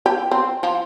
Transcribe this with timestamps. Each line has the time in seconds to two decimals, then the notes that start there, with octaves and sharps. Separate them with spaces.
0.06 G4
0.31 C4
0.63 F3